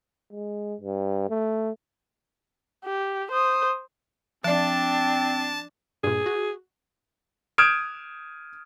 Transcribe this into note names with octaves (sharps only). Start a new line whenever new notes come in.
G#3
G2
A3
G4
C5 D#6
F3 C4 D4 D5 A5
G2 A#2 G#4
F#4
D#6 F6 G6 G#6 D7 E7